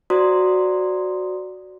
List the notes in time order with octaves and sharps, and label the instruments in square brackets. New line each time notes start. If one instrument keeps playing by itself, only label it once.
[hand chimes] F#4 C5 D5 A#5 C6 D#6